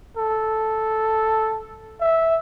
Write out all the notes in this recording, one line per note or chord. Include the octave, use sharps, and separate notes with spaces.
A4
E5